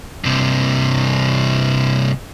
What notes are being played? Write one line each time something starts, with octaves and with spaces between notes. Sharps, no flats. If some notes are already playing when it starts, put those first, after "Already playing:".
G2 C3